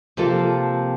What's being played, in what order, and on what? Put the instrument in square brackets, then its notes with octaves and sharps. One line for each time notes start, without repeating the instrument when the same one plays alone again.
[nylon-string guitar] C3 F3 A#3 F4 A4